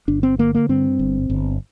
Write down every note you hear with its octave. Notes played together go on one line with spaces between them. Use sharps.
G1 D4
C4
D3 A#3
A#3
G2 C4
G1
G1